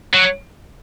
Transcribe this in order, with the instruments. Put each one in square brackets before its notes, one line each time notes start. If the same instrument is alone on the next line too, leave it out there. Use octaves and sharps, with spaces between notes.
[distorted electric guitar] F#3